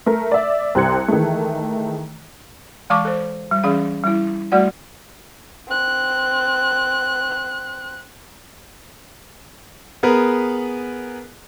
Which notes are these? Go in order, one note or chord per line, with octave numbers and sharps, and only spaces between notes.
A3 A#4
D5 E5
C2 G4 C5 F#6 G#6 C#7
D#3 E3 G#3 A3
E3 G#3 F5 A5 C#6 D6
A4 C5
G3
E3 C#4 G#4 F5
G3 E4
G3 A3 F#4 D5 F#5
C4 F#6
B3 G#4 A#4 B4